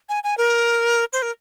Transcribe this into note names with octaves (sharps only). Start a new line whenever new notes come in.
G#5
G#5
A#4
C5
A#4